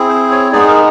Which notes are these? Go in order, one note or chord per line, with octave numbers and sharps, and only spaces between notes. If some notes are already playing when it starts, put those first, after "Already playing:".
Already playing: C4 E4 G#4
C5
C#5
G#3 B3 D#4 G#4 D5
A#4